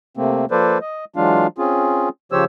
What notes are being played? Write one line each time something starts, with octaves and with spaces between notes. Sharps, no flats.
C3 A3 A#3 C4
F3 A#3 A4 B4 C5 D5
D#5
E3 F#3 G#3 D4 F4 F5
C4 C#4 F4 G#4
C#3 F3 G4 C5 C#5 E6